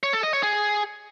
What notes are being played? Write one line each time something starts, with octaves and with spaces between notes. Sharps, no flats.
C#5
A4
D#5
C#5
G#4